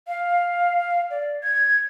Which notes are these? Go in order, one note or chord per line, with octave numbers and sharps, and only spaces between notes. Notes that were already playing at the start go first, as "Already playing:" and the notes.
F5
D5
G#6